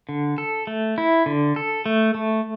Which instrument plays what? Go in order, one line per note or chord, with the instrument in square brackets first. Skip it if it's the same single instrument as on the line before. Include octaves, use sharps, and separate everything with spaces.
[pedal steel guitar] D3
A4
A3
E4
D3
A4
A3
A3